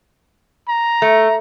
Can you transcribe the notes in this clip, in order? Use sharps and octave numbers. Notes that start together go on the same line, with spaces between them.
A#5
A3